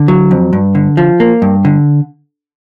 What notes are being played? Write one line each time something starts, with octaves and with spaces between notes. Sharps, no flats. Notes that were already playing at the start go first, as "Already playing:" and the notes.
Already playing: D3
F#3
F2
G2
D3
F3
A#3
G2
D3